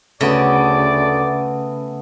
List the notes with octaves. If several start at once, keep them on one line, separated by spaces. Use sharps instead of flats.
D2 C#3 A3 B3 D5